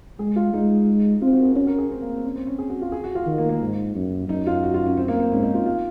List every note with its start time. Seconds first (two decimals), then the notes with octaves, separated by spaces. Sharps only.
0.19 G#3 G#4
0.36 F4
0.53 G#3 D#4
1.21 C4 F4
1.33 F#4
1.40 A#4
1.45 G#4
1.55 C#4 F#4
1.67 A#4
1.78 G#4
1.90 C4
2.02 A#3
2.13 C4
2.24 C#4
2.35 C4
2.47 C#4
2.59 G#4
2.70 F#4
2.81 F4
2.92 G#4
3.04 F#4
3.15 F4
3.27 D#3
3.38 A#3
3.49 A#3
3.61 G#2
3.95 F#2
4.29 F#2 D#4
4.47 F4
4.63 F#4
4.74 F4
4.86 C#4
4.97 C4
5.08 A#3
5.20 C4
5.32 G#2 C#4
5.43 D#4
5.54 F4
5.66 F4